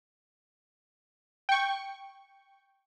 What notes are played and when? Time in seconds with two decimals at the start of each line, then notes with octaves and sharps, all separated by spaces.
1.49 G5 C#6